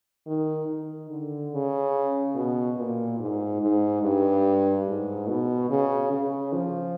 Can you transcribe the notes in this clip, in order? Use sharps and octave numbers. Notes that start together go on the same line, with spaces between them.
D#3
D#3
D3
C#3
B2
A#2
G#2
G#2
G2
G#2
B2
C#3
C#3
F3